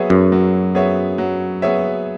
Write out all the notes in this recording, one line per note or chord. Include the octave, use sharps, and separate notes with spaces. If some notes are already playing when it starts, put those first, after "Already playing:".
Already playing: F#3 B3 G#4 C#5 E5
F#2
F#3
B3 G#4 C#5 E5
F#3
B3 G#4 C#5 E5